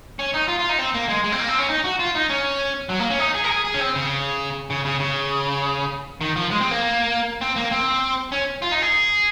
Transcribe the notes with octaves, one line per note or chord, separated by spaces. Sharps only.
C#4
D#4
F4
F4
D#4
C4
A#3
G#3
G#3
C4
A#3
C4
C#4
D#4
F#4
F4
D#4
C#4
F#3
A#3
C#4
D#4
G#4
A#4
G#4
G#4
C#4
C4
C#3
C#3
C#3
C#3
D#3
F3
G#3
C4
A#3
C4
A#3
C4
C#4
F4
D#4
G#4